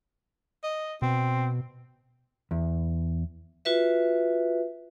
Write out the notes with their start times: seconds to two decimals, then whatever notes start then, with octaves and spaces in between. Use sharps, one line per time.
0.64 D#5
1.02 B2 C4
2.51 E2
3.65 F4 F#4 B4 E5